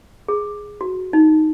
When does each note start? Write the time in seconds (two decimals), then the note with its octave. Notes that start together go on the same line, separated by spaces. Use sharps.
0.28 G#4
0.81 F#4
1.13 D#4